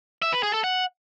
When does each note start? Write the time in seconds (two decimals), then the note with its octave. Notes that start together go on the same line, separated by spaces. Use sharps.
0.22 E5
0.33 B4
0.43 G#4
0.53 A4
0.64 F#5